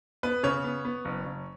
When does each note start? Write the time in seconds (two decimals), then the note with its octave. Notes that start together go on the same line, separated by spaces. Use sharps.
0.23 B3 B4
0.43 C#3 C#5
0.64 B3
0.85 B3
1.05 F#1
1.26 F#1